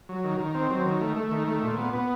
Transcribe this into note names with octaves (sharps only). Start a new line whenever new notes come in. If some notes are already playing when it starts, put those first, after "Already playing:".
F#3
D#3
D#3
C4
F#3
D#3
A3
A3
D#3
A3
A#2
B3
B3